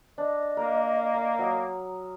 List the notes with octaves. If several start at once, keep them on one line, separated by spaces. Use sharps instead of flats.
D4 D#5
A#3 A#4
A#5
F#3 D#6